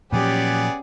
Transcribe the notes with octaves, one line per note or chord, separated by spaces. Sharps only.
A#2 F3 F#3 B3 C#4 G4 G#4 D5